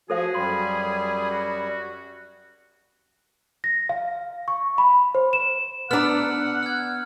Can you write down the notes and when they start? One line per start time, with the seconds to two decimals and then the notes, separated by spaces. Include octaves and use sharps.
0.10 F3 F#4 G#4 A4 C5 F5
0.35 F#2 G3 B5 C6
1.31 F#4
3.64 A#6
3.89 F5
4.48 C#6
4.78 B5
5.15 C5
5.33 E7
5.91 B3 D4 F#5 A#5 E6 F6
6.63 F6 G#6